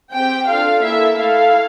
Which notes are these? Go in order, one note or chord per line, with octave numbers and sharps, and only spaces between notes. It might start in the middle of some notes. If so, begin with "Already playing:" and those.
C4 G4 G5
D4 F4 A4 F5
A#3 E4 A4 E5
A3 E4 A4 F5